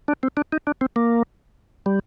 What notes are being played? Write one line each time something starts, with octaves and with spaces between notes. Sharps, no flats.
D4
C4
D4
D#4
D4
C4
A#3
G3